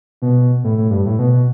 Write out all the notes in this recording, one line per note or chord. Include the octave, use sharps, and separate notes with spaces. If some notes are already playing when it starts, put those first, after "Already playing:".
B2
A2
A2
G2
A2
B2
B2